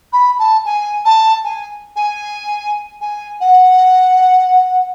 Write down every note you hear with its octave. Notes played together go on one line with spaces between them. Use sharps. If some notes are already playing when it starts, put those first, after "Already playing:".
B5
A5
G#5
A5
G#5
G#5
G#5
F#5